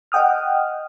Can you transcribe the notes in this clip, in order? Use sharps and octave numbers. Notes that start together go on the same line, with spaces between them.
D#5 F#5 G5 D#6 F6